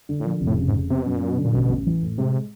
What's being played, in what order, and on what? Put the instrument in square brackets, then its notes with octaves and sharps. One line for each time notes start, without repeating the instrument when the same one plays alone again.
[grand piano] D3
[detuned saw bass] A2
[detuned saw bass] A#2 [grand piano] F3
[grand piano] F1
[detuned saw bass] A2
[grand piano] C#3
[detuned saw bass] G#2
[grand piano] F2
[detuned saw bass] C3 [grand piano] B3
[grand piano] F#2 [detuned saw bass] B2
[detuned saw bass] A#2
[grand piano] F#3
[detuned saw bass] B2
[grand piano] D3
[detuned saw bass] A#2
[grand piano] A1 [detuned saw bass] B2
[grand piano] A1
E3
A2
[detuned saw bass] C3 [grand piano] G#3